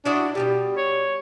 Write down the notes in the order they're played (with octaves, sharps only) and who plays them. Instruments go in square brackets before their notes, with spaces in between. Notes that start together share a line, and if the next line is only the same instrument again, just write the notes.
[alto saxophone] D4 [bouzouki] E4 F#4 D#5
[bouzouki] B2 D3 G3 [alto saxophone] G4
[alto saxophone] C#5